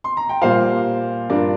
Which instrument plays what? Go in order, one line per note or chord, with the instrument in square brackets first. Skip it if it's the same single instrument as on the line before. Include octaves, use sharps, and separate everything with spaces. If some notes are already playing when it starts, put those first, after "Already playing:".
[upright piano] C6
A#5
G5
A#2 G3 A#3 F4 C5 F5
G2 G3 D4 F4 A#4 D5